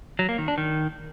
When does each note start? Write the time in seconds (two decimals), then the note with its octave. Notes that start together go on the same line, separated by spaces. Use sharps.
0.19 F#3
0.29 A#3
0.38 D#3
0.48 D4
0.58 D#3